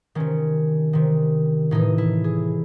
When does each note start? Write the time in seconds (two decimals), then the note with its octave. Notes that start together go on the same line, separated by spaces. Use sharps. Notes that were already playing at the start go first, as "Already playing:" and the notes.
0.15 C3 D#3 C#4
0.93 C3 D#3
1.71 A2 E3 D#4
1.98 E4
2.24 G#4